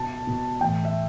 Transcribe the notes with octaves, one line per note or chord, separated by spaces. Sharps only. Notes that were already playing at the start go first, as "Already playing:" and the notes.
Already playing: B2 A5
B2
A2 E3 G5
E5